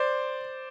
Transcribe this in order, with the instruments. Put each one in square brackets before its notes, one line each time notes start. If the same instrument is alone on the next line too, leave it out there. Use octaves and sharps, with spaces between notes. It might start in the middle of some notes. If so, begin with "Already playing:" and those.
Already playing: [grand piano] C5 D5